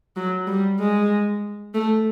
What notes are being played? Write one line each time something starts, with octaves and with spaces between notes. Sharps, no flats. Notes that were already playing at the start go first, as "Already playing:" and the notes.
F#3
G3
G#3
A3